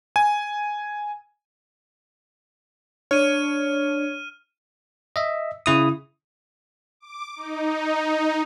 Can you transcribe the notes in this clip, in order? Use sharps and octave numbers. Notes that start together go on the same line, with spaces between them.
G#5
D4 C#5 F6 D#7
D#5 E5
C#3 E4 D#6
D6
D#4